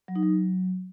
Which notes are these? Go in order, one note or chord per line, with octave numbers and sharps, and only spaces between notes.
F#3
D#4
F#3